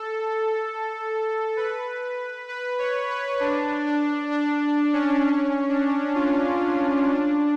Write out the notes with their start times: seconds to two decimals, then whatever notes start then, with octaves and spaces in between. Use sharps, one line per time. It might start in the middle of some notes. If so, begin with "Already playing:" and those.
Already playing: A4
1.57 B4
2.49 B4
2.79 C#5
3.10 B4
3.40 D4
3.86 D4
4.31 D4
4.93 C#4
5.23 C#4
5.69 D4
6.15 F4
7.07 D4